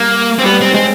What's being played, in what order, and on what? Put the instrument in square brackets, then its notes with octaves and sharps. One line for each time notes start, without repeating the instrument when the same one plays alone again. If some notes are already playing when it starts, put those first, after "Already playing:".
Already playing: [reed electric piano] G3 [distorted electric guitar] A#3
[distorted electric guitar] C4
[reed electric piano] G3 [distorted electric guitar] B3
[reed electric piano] G#3 [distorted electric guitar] C4
[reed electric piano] G#3 [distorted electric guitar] C4